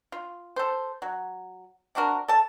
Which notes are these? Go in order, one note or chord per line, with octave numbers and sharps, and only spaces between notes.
F4
A4 C5
F#3
C3 D4 F#4 A#4
A4 A5